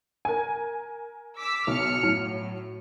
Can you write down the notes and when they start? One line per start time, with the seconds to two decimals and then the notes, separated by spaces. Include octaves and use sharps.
0.25 A#4 G#5
1.38 D6 E6 B6
1.67 B1 F6 C#7
2.03 A2 F#3